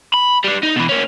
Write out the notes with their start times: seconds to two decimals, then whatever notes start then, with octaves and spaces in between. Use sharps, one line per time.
0.14 B5
0.44 G3 D4
0.63 D#4
0.76 B2 E3
0.89 A#3 C#4